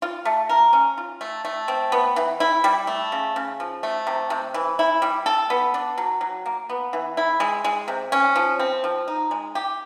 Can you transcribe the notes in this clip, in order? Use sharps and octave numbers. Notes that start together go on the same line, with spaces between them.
F4
A3
A#4
C#4
F4
A3
A3
C4
B3
E3
E4
G3
A3
C#3
C#3
F3
A3
C3
C3
E3
E4
G3
A4
B3
D4
F#3
F#3
A#3
B3
E3
E4
G#3
G#3
C3
C#4
F3
C4
F3
D#4
G#3
G4